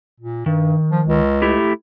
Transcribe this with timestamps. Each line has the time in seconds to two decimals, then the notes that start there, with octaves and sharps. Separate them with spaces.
0.20 A#2
0.46 G2 D#3
0.91 F3
1.07 C#2
1.42 A3 E4 G4